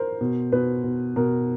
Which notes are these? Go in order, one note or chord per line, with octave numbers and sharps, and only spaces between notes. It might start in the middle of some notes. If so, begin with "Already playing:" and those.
Already playing: A#4 C5
B2
B2 B4
B2
B2 A#4